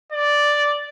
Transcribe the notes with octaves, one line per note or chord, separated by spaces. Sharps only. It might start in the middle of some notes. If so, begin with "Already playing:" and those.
D5